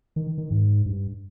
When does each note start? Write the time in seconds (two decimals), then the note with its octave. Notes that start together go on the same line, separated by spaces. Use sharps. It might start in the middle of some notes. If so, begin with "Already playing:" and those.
0.16 D#3
0.38 D#3
0.51 G#2
0.86 G2